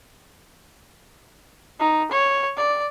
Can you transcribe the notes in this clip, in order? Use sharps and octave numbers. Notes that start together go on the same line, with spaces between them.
D#4
C#5
D5